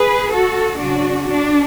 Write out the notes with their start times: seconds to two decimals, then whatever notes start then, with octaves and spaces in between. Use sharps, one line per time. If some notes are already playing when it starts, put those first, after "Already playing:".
Already playing: G#4 B4
0.34 F#4 A4
0.81 C#3 F#3 C#4 D4 F#4
1.30 D4